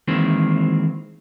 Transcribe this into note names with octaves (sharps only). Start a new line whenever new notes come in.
D#3 E3 G#3 A#3 C4